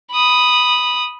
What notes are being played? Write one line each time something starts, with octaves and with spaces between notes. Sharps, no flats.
B5 D#6